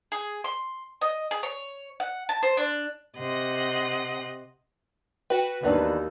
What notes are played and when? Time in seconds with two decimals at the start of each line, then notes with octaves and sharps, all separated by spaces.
0.12 G#4
0.44 C6
1.01 D#5
1.31 G#4
1.43 C#5
2.00 F#5
2.29 A5
2.43 C5
2.57 D4
3.16 C3 D#5 F#5 C6
5.30 F#4 B4 G5
5.63 D#2 E3 B3 D4